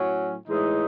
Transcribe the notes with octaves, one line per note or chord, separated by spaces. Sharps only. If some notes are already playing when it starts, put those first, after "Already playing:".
Already playing: A2 F#3 C#4
A2 E3 G#3 D#4